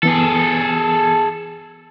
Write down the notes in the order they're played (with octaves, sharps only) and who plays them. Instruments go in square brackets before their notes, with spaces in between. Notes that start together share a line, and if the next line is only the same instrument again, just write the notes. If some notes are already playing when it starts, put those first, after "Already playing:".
[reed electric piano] E3 B3 [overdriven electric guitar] G#4 A4